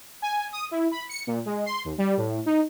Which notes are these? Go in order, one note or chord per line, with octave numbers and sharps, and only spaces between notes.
G#5
D#6
E4
B5
C#7
A#2
G#3
C6
D#2
G3
A2
D#4